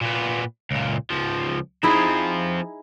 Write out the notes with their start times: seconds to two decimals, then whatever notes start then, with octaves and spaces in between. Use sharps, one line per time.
0.01 A#2 B3
0.71 C#2 A#2
1.10 C#2 F3
1.83 F3 C4 D#4 E4 G#4